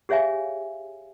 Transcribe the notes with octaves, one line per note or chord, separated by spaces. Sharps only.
G4 G#4 C#5 E5 F5 G#5